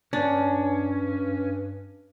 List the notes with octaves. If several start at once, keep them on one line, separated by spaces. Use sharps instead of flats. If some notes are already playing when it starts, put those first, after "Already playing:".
G2 C#4 D4